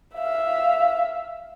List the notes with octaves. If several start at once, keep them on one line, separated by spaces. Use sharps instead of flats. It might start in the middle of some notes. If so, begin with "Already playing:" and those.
E5 F5